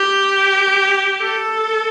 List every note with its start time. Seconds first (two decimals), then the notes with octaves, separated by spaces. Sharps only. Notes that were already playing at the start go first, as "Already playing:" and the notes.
Already playing: G4
1.21 A4